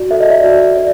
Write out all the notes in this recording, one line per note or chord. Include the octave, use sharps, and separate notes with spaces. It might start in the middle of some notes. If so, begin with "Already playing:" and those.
Already playing: F#4 D5
A4 E5
D#5
D5 E5
F#4
D5